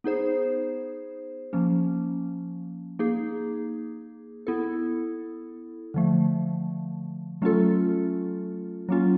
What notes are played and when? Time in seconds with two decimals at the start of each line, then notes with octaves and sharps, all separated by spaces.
0.04 B3 D#4 G#4 C5
1.53 F3 A#3 C#4
2.99 A#3 D#4 G#4
4.47 B3 E4 A4
5.94 D3 F3 A3
7.42 F#3 A3 C#4 F4 A4
8.89 F#3 A#3 C#4 F4